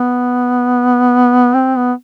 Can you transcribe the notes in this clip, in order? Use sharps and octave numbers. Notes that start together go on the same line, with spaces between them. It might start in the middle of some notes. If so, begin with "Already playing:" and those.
Already playing: B3
C4
B3